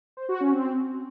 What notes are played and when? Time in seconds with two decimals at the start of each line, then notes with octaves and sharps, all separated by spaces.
0.17 C5
0.29 F#4
0.41 C#4
0.52 C4